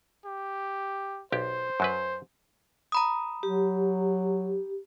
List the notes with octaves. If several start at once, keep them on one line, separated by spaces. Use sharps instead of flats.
G4
B1 G4 C5
F#2 F#3 B4
A#5 B5 D#6
F#3 G4